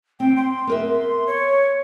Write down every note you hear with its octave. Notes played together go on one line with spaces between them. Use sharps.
C4 G5
C6
B3 A#4 E5
C#5